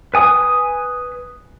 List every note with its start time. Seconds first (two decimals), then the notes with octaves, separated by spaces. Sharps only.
0.14 B4 G#5 D#6